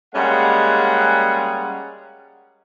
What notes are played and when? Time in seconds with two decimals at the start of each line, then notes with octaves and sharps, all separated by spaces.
0.15 G3 G#3 A#3 C#4 F#5